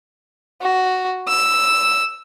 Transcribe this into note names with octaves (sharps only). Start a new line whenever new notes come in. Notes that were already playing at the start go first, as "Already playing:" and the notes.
F#4
E6